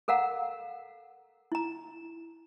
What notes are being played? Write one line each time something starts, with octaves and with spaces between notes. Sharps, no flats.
A4 A#4 F5 F#5 A#5
E4 A#5